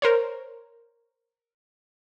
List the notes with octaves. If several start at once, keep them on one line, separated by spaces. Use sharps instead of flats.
A#4 C5 C#5